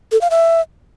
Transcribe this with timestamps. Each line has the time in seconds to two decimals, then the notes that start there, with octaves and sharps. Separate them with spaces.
0.12 A4
0.21 F5
0.31 E5